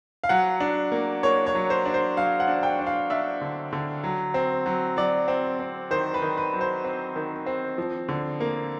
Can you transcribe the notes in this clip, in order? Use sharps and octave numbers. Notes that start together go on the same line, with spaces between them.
F5
F#3 F#5
D4
A#3
A#3 C#5
C#5
F#3
C5
D4
C5
F#3 F5
F#5
D4
G5
D4
F5
D4 E5
D3
D3
F#3
C4
F#3
F#3 D5
C4
C4
D#3 C5
B4
D#3
B4
F#3
C5
C4
D#3
C4
F3
D3
A#3